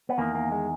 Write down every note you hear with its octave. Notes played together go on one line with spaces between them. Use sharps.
B3
E2 D#3 A#3
A#3
G#3